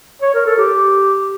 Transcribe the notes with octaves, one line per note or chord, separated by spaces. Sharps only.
C#5
A#4
A4
G4